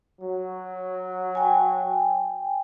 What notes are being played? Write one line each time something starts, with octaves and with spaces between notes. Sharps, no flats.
F#3
G5 G#5